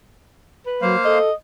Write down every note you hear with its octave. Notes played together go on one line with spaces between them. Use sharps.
B4
F#3 A#3 C5 F5
A4 D#5